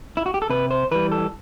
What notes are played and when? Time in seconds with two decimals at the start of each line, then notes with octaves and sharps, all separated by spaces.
0.17 E4
0.26 F#4
0.34 G4
0.42 A4
0.49 C3 B4
0.71 C5
0.91 E3 G3 B4
1.12 A4